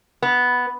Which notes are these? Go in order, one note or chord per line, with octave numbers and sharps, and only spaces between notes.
B3